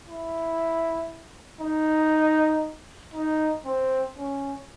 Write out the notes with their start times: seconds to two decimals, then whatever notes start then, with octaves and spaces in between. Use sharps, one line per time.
0.08 E4
1.61 D#4
3.14 D#4
3.65 C4
4.16 C#4